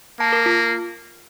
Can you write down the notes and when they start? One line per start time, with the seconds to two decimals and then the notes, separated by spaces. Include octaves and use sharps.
0.20 A#3 A5
0.33 A#4
0.46 F4